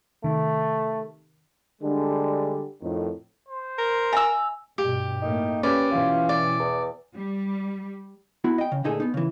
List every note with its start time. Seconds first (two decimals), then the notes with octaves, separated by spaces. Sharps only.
0.24 C3 D#3 A3
1.82 D3 G3 G#3 D4
2.81 F2 A2 D#3
3.48 C5
3.78 A#4
4.13 E5 G#5 A#5 E6
4.78 G2 B2 G4
5.22 A2 A3 A#3 D#4
5.63 C#4 G4 B4 D5
5.91 B2 E3 F4
6.29 D5
6.59 E2
7.16 G3
8.44 B3 E4 F#4
8.58 D#5 G5
8.72 C#3
8.84 D2 A#2 D#4 G#4 A4 G#5
9.00 B3 D#4
9.14 C#3 E3